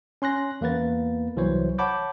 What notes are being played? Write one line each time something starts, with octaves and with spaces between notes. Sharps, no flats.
C#4 C6 F#6 A#6
E2 A#3 B3 B4 A6
C2 E3 F#3 C5 C#5
C#5 F#5 A5 B5 D6 G6